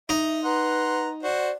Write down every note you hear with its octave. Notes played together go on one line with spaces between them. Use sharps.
D#4 E5
B4 F#5 A#5 C6
F#4 C5 D5 F#5